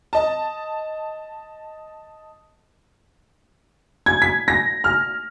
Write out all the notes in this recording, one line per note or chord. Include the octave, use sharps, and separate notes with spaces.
D#5 A5
G#6
B6
A#6
F6